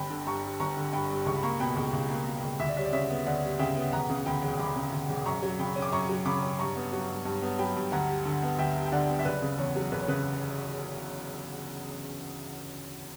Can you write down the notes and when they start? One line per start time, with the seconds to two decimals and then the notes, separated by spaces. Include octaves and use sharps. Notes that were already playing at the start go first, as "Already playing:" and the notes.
Already playing: G1 G5 B5
0.10 D3
0.27 G2 A#5 C#6
0.43 G3
0.60 G1 A#5 C#6
0.77 D3
0.93 G2 G5 B5
1.10 G3
1.26 C#2 C#6
1.35 B5
1.43 A#3 A#5 C#6
1.60 B2 G5 B5
1.77 C#2
1.93 C#2
2.10 A#3
2.26 B2
2.43 C#2
2.59 D2 E5
2.68 D5
2.76 G3 C#5 E5
2.85 D5
2.93 C#3 C#5 E5
3.10 B3
3.26 D2 D5 F#5
3.43 G3
3.59 C#3 E5 G5
3.76 B3
3.92 E1 F#5 A#5
4.10 C#3
4.26 D2 G5 B5
4.43 E1
4.59 E1 B5 D6
4.76 C#3
4.92 D2
5.09 E1
5.26 F#2 A#5 C#6
5.42 F#3
5.59 C#3 G5 B5
5.76 C#4
5.82 D6
5.92 F#2 A#5 C#6
6.09 F#3
6.26 C#3 B5 D6
6.43 C#4
6.59 G2 A#5 C#6
6.76 B3
6.92 F#3
7.09 G2
7.25 G2
7.42 B3
7.59 F#3 G5 B5
7.76 G2
7.92 D2 F#5 A#5
8.09 G3
8.25 D3
8.42 B3
8.59 D2 E5 G5
8.75 G3
8.85 G5
8.92 D3 D5 F#5
9.08 B3
9.19 E5
9.25 F#1 B4 D5
9.42 C#3
9.58 E2 C#5
9.75 F#3
9.92 F#1 B4
10.00 C#5
10.08 C#3 B4